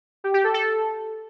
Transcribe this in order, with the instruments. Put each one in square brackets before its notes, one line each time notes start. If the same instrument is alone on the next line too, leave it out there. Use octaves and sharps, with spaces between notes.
[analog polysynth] G4
G4
A4
A4